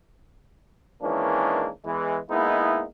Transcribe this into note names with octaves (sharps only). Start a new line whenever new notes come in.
D#3 E3 G#3 A#3 C#4 D4
E2 E3 G#3
G#3 A#3 B3 D#4 E4